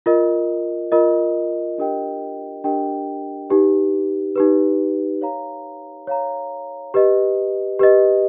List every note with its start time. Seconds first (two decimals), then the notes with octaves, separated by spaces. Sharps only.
0.06 F4 A#4 D#5
0.92 F4 A#4 D#5
1.78 D4 G4 A#4 D#5 G5
2.64 D4 G4 A#4 D#5 G5
3.50 D#4 G4 B4
4.36 D#4 G4 B4
5.21 C#5 F5 A#5
6.07 C#5 F5 A#5
6.94 G4 B4 D#5
7.79 G4 B4 D#5